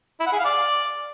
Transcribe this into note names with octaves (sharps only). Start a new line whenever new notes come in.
E4
F#5
G#4
F5
D5